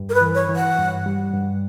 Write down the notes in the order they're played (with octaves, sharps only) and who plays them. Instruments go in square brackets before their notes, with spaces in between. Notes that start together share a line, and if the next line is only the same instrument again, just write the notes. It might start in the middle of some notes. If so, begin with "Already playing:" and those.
Already playing: [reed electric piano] G2
[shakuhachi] A#4
B4
[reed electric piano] E3
[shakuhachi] C#5
[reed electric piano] E3
[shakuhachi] F#5
[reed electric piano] G2
G3
G2